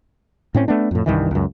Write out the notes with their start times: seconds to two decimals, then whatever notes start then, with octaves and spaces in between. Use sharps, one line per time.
0.55 A2 C4 C#4
0.68 A3 B3 D4
0.91 F2 A2
1.06 C2 G2 D#3 E3
1.31 C#2 F#2